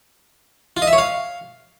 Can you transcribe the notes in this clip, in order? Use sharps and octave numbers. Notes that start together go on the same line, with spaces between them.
F4
D#5
E5
C#5
F5